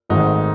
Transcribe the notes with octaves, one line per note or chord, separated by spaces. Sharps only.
G#1 G#2 D#3 A3 D#4